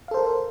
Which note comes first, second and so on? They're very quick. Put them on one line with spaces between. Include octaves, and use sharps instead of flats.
F5 A4 C5 A#4